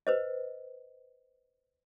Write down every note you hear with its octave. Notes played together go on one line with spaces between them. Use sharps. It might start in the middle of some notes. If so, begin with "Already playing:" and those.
B4 C5 D#5